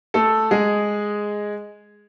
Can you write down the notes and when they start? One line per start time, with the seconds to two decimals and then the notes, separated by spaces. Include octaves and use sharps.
0.14 A3 A4
0.51 G#3 G#4